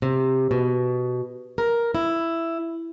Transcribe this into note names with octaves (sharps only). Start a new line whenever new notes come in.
C3
B2
A#4
E4